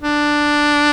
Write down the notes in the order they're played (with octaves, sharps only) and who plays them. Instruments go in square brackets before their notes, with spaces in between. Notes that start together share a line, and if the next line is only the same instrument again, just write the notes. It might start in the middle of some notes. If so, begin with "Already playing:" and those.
[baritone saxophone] D4